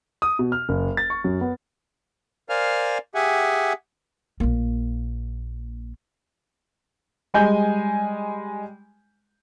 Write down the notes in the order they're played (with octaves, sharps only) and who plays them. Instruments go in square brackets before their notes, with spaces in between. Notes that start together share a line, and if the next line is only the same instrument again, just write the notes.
[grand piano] D#6
B2
F6
F#1
A6
C#6
F#2
B3
[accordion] A#4 C5 D5 F5 G#5 F6
G4 G#4 E5 F#5 G#5
[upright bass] A#1 A#3
[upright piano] G3 G#3 G#5 G6